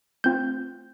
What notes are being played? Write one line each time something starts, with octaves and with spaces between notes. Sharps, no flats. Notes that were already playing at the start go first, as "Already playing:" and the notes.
A3 C4 F4 G6